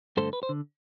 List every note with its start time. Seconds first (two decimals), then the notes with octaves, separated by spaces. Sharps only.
0.17 G2 D3 A3 A4 C5
0.33 B4
0.43 C5
0.49 D3